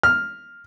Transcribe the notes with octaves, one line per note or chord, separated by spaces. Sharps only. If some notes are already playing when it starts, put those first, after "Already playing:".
F6